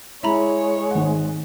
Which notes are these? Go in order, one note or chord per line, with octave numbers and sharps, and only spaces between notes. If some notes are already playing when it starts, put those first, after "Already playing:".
G#3 E4 C#5 E5 A#5 B5
G#1 F#5